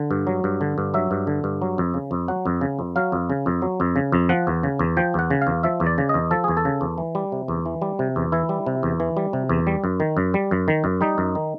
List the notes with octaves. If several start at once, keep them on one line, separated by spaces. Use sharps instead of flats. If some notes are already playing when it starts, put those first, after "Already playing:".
Already playing: D3
G2
F#3
G2
D3
G2
F#3 E5
G2
D3
G2
F#3
F2
C#3
F2
F#3 F#5
F2
C#3
F2
F#3 F5
F2
C#3
F2
F#3
F2
C#3
F2
F3 F#5
E2
C#3
E2
F3 G5
E2 F#5
C#3
F5
E2
F3 E5
E2
D5
C#3
E2 D#5
F3 A4
E2 G#4
A4
C#3
E2
E3
G3
C3
E2
E3
G3
C3
E2
E3 E4
G3
C3
E2
E3
G3
C3
E2
G3
F#2
D#3
F#2
G3
F#2
D#3
F#2
G3 D#4
F#2
D#3